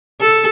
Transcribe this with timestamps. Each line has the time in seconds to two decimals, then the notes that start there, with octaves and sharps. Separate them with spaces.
0.21 A4